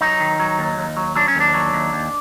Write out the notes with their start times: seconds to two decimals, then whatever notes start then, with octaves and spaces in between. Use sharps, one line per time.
0.01 F#3 D#4
0.20 D#3
0.40 F#3
0.59 D#2
0.78 D#2
0.97 F#3
1.16 F#3 D4
1.28 C#4
1.35 D#2
1.40 D4
1.54 F#3
1.73 D#2
1.93 D#2